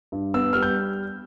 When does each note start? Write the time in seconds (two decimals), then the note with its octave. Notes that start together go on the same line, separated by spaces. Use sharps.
0.12 G2
0.34 B3 E6
0.53 G3 F6
0.62 G6